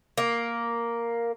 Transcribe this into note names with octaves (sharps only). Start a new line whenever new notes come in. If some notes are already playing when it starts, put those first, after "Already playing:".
A#3